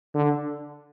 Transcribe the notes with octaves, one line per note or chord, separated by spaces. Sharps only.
D3